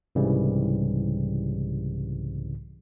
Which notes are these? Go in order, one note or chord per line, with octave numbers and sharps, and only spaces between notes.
C2 G#2 C#3 E3 G3